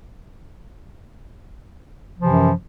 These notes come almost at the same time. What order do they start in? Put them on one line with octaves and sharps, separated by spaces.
F3 C3 E3 F#2